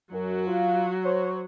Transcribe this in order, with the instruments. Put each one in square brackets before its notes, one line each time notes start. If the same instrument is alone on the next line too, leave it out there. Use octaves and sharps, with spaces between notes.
[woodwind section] F#2 [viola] F#3 F#4
[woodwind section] F4
C5 C#5